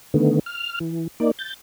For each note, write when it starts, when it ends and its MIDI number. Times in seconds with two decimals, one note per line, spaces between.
0.14 0.39 50
0.14 0.39 51
0.14 0.39 57
0.14 0.39 59
0.46 0.79 89
0.80 1.07 52
1.20 1.31 58
1.20 1.31 63
1.20 1.31 74
1.39 1.54 91
1.39 1.54 93